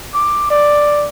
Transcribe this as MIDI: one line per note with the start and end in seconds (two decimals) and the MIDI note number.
0.14 0.46 86
0.50 1.08 74